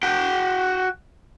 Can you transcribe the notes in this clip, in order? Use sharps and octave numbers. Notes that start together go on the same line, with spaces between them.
F#4 G5